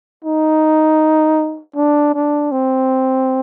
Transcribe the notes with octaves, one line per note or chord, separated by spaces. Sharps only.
D#4
D4
D4
C4